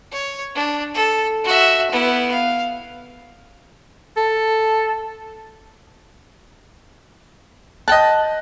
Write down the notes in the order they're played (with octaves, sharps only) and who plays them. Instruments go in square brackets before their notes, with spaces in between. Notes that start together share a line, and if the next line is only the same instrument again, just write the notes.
[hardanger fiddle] C#5
D4
A4
F#4 E5
B3 E4
F5
[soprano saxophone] A4
[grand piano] D#5 F#6 [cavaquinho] G5 A5